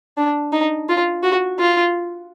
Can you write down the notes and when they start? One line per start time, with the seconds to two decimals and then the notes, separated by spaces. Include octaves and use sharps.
0.17 D4
0.53 D#4
0.89 F4
1.23 F#4
1.59 F4